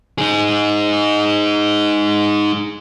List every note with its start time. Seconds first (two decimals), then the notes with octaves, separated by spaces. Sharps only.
0.18 D#4 G#4